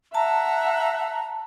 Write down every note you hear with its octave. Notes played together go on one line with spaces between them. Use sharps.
E5 F#5 A5 A#5